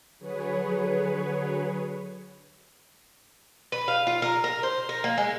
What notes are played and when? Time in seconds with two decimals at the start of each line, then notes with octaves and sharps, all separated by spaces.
0.18 D3 F#3 G#4 B4 C#5
3.72 B4
3.88 F5
4.07 F4
4.22 A#4
4.44 A#4
4.63 C5
4.89 A#4
5.04 A#3
5.18 G#3